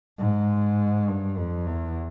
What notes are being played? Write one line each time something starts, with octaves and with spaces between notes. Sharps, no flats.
G#2
G2
F2
E2